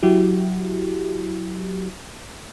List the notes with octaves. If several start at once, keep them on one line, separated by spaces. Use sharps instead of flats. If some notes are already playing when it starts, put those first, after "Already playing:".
F#3 E4 F#4 G4